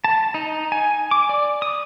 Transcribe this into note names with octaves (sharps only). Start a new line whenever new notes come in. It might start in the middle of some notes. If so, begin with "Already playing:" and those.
A5
D#4
G#5
D6
D5
D#6